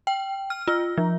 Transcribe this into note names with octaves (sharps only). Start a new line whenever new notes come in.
G5
F6
F4
F3